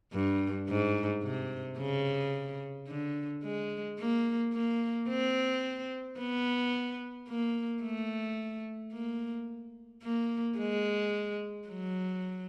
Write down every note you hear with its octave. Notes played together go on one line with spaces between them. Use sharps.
G2
G#2
C3
C#3
D3
G#3
A#3
A#3
C4
B3
A#3
A3
A#3
A#3
G#3
F#3